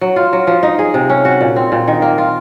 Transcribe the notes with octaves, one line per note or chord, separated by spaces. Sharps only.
F#3
F4
F#3
F3
D#4
G#4
C3
C#4
F#4
A#2
C4
A#2
D#3
A#3
F4